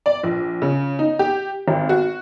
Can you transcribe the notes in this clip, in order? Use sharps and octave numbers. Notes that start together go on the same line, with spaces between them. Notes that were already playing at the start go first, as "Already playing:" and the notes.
D5
A#1
C#3
D#4
G4
G#1
F#4